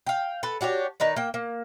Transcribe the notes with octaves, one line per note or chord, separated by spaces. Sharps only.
F5 G5
A4 B4
D4 F#4 G4 C#5
D#3 D#4 B4 D5
A#3 G5
A#3